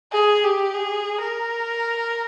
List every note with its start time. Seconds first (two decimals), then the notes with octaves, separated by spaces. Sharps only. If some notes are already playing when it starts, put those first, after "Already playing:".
0.13 G#4
0.44 G4
0.74 G#4
1.21 A#4